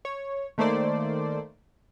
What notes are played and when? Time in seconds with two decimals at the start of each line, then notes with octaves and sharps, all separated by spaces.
0.05 C#5
0.58 D#3 A3 A#3 C5 D5